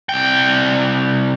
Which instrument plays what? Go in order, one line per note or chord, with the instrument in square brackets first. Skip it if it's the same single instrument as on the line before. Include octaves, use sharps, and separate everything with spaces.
[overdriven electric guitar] C2 G5